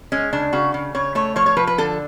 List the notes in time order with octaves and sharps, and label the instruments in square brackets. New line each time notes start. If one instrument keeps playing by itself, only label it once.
[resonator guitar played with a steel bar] G#3 C#4
C#3 D4
C#3 F#4
C#3
C#3 C#5
A3 C#5
F3 C#5
C#5
F3 B4
B4
D3 A4